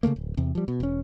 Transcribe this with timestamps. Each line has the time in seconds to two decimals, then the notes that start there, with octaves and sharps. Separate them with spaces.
0.03 C#3 E3 A3 A#3
0.16 D1
0.37 E2 C3
0.55 F3 G3
0.68 B2
0.80 E1 C#4